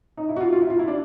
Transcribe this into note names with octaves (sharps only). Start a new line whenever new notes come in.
D#4
E4
F#4
F4
F4
E4
F4
E4
D4